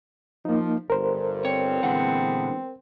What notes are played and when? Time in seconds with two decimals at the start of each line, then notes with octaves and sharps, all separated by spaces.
0.45 F3 A#3 D#4
0.90 G1 G2 A#4 C5
1.45 C4 C#5
1.83 A#2 D3 E3 G#3 B3 F#5